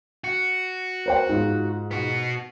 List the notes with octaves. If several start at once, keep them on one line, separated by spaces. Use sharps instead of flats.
F#4
A#4 C5 G5
G#2 F4
B3 F#4